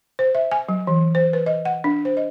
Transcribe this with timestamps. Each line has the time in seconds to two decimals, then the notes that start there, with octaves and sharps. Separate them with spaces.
0.19 C5
0.35 E5
0.52 G#5
0.69 F#3
0.87 E3
1.15 C5
1.33 B4
1.46 D#5
1.65 F#5
1.84 D4
2.05 C5
2.17 D#5